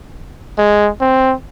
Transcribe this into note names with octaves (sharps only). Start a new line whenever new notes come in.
G#3
C4